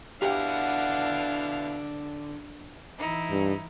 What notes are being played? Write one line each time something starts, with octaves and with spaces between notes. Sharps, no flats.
B2 D3 D4 E4 G4 F5 F#5
E3 D#4 E4
G2